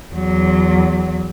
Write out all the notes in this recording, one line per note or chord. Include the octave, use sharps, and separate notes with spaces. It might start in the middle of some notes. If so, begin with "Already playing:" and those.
E2 F#3